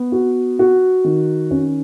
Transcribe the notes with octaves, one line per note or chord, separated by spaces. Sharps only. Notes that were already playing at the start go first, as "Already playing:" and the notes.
Already playing: B3
F#4
F#4
D#3
C#4